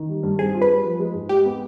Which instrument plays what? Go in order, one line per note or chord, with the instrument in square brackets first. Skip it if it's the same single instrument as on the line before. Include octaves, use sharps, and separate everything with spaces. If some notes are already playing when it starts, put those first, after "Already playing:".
Already playing: [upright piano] D#3
G3
G2
[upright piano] C4 [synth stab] G#4
[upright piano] F4
[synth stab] B4
[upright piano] G3
F3
G#3
G#2
[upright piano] G#3 [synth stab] G4
[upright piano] B3